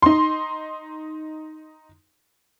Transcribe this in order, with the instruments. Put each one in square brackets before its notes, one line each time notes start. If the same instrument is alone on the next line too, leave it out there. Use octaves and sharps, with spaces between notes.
[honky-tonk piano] D#4 C6